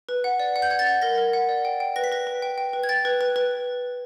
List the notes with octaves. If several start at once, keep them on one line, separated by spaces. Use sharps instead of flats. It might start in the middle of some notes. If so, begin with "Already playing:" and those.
B4
F#5
D5
F#5
G6
F#5 G#6
A6
F#5
A#4 A#6
A#4
F#5
D5
G5
G5
B4 A#6
B6
B4 A#6
B4
G5
G5
B4
G#6
G5 A6
B4
B4
B4